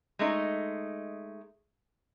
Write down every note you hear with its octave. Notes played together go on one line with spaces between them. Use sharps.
G#3 A3 D#4